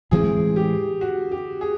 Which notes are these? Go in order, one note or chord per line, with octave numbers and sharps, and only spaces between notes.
A2 E3 G#3 C4 G#4
G4
F#4
G4
G#4